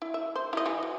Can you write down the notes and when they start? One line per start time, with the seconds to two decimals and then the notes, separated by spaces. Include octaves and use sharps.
0.02 E4
0.14 E5
0.36 C5
0.53 E4 G4 D#5
0.66 E3
0.83 F#3